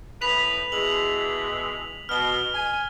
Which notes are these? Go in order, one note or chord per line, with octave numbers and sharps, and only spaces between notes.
A2 D#4 B4 B6 F7
B2 E3 G#3 F#7
B2 F6 G7
G#5